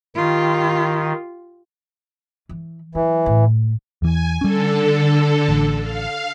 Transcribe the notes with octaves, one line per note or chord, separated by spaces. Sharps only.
D#3 F4 G4
E3
E3 F#3
A2
E2 E3 G#5
D3 G3 C#4 A4
A1
F5